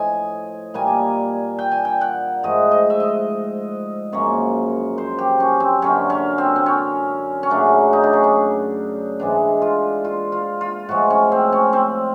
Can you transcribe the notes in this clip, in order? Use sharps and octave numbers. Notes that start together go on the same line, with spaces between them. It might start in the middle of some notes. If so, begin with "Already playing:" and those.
Already playing: A2 F3 A3 D#5 G#5
A#2 G3 A#3 G#5
G5
G#5
G5
F#5
G#2 F3 A3 D#5
D#5
E5
D#5
F#2 C#3 F3 A#3 C#5
C5
G4
C#4
C4
F#2 D3 F#3 C#4
C#4
C4
C4
C#4
C#4
F#2 C#3 F#3 A3 D4
D#4
D4
C#4
D4
G#2 E3 G#3 D4
F4
F4
F4
F4
A2 F3 G#3 F#4
C#4
C4
C#4
C4